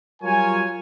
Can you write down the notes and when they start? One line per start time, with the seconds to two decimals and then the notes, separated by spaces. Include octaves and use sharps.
0.22 F#3 G3 F4 A#4 C#5 G#5